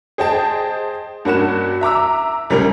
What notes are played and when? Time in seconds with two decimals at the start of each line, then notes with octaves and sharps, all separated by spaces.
0.18 G#4 C5 D#5 G5 A5
1.25 G2 A#3 C#4 F#4 F#6 E7
1.81 E5 A#5 D6 E6
2.50 C#2 G3 C#4 A#4